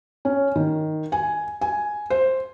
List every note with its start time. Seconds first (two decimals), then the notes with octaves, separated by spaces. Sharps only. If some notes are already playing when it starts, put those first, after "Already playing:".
0.25 C#4
0.56 D#3
1.12 G#5
1.61 G#5
2.10 C5